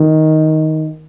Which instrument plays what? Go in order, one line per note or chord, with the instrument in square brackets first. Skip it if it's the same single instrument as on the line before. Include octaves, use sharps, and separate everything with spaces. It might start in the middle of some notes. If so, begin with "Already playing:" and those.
Already playing: [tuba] D#3